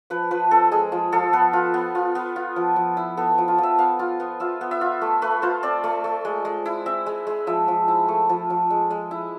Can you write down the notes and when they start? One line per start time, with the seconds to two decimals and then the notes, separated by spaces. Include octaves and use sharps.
0.10 F3 B4
0.31 F3 B4
0.51 C4 A4
0.71 G#3 G#4
0.92 F3
1.12 F3 A4
1.33 B3 B4
1.53 F4
1.74 B3
1.95 F4
2.15 B3
2.36 F4
2.56 F3
2.76 F3
2.97 E4
3.17 B3 A4
3.38 F3
3.48 F4
3.58 F3 E5
3.78 B3 F5
3.99 F4
4.20 B3
4.40 F4 E5
4.61 B3
4.71 E5
4.81 F4
5.02 A3
5.22 A3 B4
5.42 F4 C5
5.63 C4 D5
5.84 A3
6.04 A3
6.25 G#3
6.45 G#3
6.66 E4
6.86 C4 E5
7.06 G#3
7.27 G#3
7.47 F3 E5
7.68 F3
7.88 E4
8.08 A3
8.29 F3
8.50 F3
8.70 G#3
8.91 G#3
9.11 E4